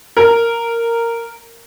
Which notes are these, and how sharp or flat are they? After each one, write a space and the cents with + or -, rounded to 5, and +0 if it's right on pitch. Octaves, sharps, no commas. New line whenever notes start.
A#4 -10